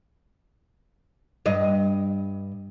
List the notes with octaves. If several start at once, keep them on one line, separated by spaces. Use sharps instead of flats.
G2 D#5